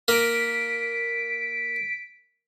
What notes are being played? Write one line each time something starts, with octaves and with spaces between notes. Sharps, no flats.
A#3 B6 D7